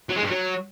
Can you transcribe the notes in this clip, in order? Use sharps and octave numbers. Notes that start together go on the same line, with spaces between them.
F#3
G#3
G2
F#3